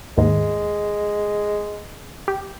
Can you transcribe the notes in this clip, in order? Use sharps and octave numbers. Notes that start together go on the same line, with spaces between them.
D#2 G#2 G#3
G4